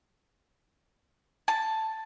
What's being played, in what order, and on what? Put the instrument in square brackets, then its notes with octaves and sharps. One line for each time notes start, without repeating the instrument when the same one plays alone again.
[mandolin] A5